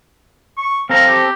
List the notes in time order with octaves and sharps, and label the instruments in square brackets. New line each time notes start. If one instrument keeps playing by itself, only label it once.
[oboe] C#6
[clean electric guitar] C4 A4 A#5 [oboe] F5
[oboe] G4